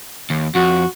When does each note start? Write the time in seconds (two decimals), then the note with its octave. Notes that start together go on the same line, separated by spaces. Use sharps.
0.30 D#2
0.55 F2 F#4